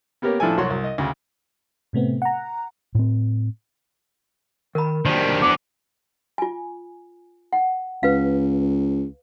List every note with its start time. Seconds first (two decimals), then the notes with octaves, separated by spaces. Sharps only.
0.22 A#3 B3 G4 A#4 C#5
0.40 A2 F3 D4 E4 A4 G#5
0.57 C2 F#3 F#4 C#5 C6
0.70 C2
0.84 D#5
0.98 D2 C#3
1.93 A2 C3 A3 B3 C4
2.22 F#5 A#5
2.95 A2 C4
4.75 D#3 A#4 B5
5.05 D#3 F#3 G3 D4 C5
5.42 E3 B3 D6
6.38 F4 G#5
7.53 F#5
8.03 C#2 B4 F5